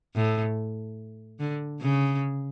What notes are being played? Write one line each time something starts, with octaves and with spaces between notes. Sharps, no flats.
A2
D3
C#3